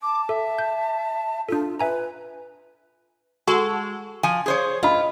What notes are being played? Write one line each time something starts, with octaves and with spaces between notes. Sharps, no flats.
A5 D6
A4 E5
G6
D4 F4 A4
B4 E5 G#5 A#5
G#3 F#4 A4
F3 G#5
G#4 C5 C#5
F4 D#5 B5